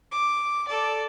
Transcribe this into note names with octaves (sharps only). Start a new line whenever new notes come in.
D6
A4 D5